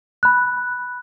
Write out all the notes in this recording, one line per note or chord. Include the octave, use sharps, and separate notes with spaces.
B5 F#6